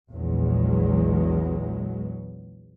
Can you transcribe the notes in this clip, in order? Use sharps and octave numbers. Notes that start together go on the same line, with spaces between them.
A#1 E2 F#3 G#3